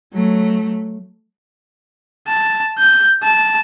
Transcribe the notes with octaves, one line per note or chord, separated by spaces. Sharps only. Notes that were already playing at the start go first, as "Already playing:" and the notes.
F#3 A3
A5
G6
A5